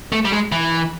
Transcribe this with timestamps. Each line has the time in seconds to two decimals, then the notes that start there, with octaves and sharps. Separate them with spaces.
0.12 A3
0.25 G3
0.32 G#3
0.52 E3